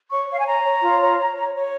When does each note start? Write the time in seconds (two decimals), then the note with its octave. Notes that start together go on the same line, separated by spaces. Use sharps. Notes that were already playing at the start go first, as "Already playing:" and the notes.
0.10 C#5 C#6
0.28 C#5 F5
0.38 G#5
0.46 C#5 A#5
0.64 C#5
0.82 F4
1.00 C#5
1.18 C#5
1.35 C#5
1.54 C#5